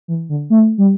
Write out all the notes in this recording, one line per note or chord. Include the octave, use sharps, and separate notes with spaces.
E3
D3
A3
G3